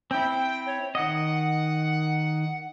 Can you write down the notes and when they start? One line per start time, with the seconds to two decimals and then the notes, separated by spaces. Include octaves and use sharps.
0.11 C4 E4 G5
0.66 C#5
0.95 D#3 D#5 F#5